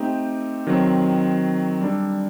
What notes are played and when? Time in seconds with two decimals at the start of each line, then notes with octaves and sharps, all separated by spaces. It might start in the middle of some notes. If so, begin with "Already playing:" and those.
Already playing: A3 C4 D#4 G4
0.67 D#3 F#3 C4
1.81 G3 D4 A4